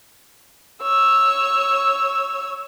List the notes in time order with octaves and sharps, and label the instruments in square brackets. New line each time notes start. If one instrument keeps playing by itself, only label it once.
[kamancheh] C#5 E6